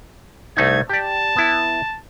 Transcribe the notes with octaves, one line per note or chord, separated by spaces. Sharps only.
C2 A3 D#4 G#6
G4 D5 A5
B3 E4